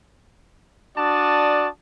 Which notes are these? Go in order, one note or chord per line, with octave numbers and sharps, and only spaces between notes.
D4 F#4 D5 A5 D#6